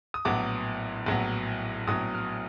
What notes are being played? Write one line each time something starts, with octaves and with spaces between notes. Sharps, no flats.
D#6
A#1 A2 F#3 B3 D6
A#1 A2 F#3 B3
A#1 A2 F#3 B3 D#6
F6